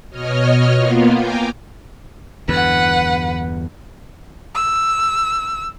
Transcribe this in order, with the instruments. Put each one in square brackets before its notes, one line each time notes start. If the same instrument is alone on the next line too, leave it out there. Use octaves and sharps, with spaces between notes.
[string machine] B2 C#5 D#5 F6
A#3 B3 F4
G5 G#5 A#5 D6
[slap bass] E2 G2 D3 [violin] B4 F#5
[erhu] E6